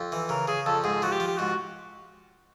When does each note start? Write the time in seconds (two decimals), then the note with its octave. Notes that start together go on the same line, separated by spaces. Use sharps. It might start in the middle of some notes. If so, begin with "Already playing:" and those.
Already playing: F2
0.12 E3
0.29 C#3 A#4
0.48 C#3 G#4
0.66 F2 A4
0.84 G#2 G#4
1.02 F3 F#4
1.12 G4
1.20 F3
1.28 G4
1.38 G#2 F#4